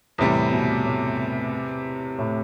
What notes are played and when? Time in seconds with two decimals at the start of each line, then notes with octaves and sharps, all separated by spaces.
0.18 E2 A2 C3 G3
0.52 B2
0.85 A2
2.18 A2